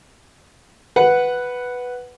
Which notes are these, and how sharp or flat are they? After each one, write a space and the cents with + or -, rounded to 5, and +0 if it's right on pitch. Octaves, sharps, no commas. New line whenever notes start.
B4 +0 F#5 +0